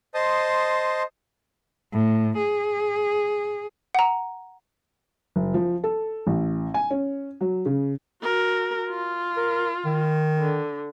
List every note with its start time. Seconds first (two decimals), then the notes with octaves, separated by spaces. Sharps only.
0.14 C5 D#5 A5 C6 D#6
1.94 A2
2.37 G#4
3.95 F#5 A#5
5.36 F#1
5.54 F3
5.84 A4
6.27 A1
6.74 G#5
6.91 C#4
7.41 F#3
7.66 C#3
8.22 F#4 A#4
8.90 F4
9.37 A#4
9.86 D#3
10.39 D3